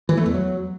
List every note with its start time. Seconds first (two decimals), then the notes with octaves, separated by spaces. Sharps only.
0.09 E3
0.17 A3
0.26 E2
0.34 F#3